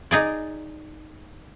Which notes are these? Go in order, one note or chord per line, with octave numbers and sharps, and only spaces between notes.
D#4 G#4 D5